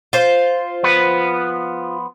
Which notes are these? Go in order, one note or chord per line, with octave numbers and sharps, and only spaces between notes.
F4 C5
F3 B3 B4